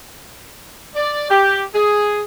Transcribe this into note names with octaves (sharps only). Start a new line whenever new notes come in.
D5
G4
G#4